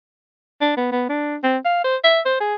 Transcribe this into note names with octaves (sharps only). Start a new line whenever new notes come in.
D4
B3
B3
D4
C4
F5
C5
E5
C5
G#4